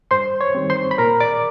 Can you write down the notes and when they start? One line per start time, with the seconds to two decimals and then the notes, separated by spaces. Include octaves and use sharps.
0.11 G2 C5 C6
0.41 C#5 C#6
0.55 D#3 G3 C4
0.70 C5 C6
0.91 B5
0.98 A#2 A#4 A#5
1.20 D5 D6